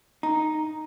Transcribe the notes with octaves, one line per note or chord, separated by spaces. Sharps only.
D#4 A#5